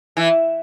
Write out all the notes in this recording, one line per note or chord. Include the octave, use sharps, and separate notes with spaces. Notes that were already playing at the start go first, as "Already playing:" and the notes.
E3